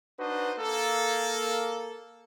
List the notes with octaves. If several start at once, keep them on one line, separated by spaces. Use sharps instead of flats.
D4 D#4 F#4 B4 C5 D#5
A#3 A4